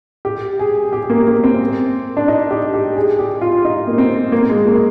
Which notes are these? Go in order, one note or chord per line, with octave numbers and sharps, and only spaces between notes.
G4
G#4
G4
A#3
A#3
C4
D4
D#4
G4
G4
G#4
G4
F4
D#4
A#3
C4
A#3
G#3
A#3